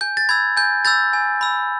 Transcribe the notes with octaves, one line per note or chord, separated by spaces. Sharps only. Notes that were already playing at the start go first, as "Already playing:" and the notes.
G#5 G6
A6
B5 E6 G#6
G#5 G6
B5 E6 G6 A6
G#5
B5 E6